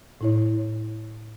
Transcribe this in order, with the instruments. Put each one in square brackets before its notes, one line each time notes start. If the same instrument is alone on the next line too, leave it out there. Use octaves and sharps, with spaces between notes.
[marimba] A2 E4 C#5